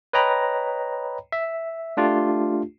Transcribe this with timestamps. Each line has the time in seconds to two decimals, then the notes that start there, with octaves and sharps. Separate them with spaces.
0.13 B4 C#5 D#5 G5 A#5 B5
1.32 E5
1.97 A3 D4 F4 G4